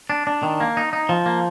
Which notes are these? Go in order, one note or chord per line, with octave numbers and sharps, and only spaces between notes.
D4
D4
D#3
A#3
D#4
D#4
F3
A#3